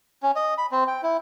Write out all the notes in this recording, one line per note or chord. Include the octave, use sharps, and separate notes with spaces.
C#4
D#5
B5
C4
G5
E4